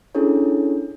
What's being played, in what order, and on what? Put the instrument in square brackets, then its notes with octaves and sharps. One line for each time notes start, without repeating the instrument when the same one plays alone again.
[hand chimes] C#4 D4 E4 G#4 A4 C#5